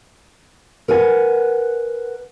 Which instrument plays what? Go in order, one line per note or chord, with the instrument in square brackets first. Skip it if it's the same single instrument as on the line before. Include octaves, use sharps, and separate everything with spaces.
[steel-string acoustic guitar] A#4 B4 F#5 G#5